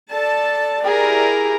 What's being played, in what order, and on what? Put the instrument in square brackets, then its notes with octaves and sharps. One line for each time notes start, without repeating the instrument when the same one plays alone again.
[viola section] A4 A5 [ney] D5
[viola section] E4 G4 A#4 [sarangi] G#4